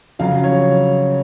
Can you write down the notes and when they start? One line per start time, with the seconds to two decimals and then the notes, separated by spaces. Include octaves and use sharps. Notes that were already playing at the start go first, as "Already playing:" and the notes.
0.19 F2 C#3 F#3 F5
0.44 C#5